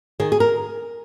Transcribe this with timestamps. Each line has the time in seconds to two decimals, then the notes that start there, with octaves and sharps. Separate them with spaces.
0.20 D#3 G#4
0.32 G#4
0.40 A#4